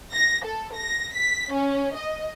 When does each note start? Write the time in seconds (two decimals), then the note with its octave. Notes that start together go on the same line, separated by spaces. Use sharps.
0.13 A#6
0.45 A4
0.74 A#6
1.14 B6
1.53 C#4
1.96 D#5